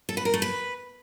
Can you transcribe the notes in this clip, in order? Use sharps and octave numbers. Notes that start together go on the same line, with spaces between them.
A4
B4
A#4
A3
B4